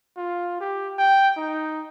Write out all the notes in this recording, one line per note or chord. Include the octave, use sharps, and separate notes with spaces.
F4
G4
G5
D#4